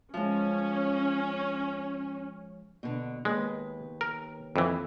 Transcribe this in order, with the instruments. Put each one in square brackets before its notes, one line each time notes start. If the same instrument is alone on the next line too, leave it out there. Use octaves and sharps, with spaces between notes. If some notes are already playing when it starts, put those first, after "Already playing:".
[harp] F3 G#3 [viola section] C#4
[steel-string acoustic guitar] B2 D3
[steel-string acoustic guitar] D#2 B4 [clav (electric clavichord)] G#3
[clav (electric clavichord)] A#4
F2 E3